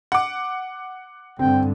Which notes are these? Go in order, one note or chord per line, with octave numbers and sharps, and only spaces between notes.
F#5 D6
G2 D3 C4 G5